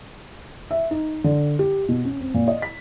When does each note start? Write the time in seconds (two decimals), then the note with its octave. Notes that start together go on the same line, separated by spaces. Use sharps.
0.71 E5
0.91 D#4
1.24 D3
1.59 G4
1.89 B2
2.05 C#4
2.21 C4
2.34 A#2
2.48 D#5
2.62 B6